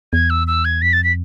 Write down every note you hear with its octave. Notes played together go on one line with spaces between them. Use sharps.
E2 G#6
E6
E6
G#6
F2 B6
A6
B6